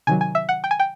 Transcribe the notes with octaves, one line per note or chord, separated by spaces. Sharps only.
C3 D#3 F#3 G#5
G#5
E5
F#5
G5
G#5
G5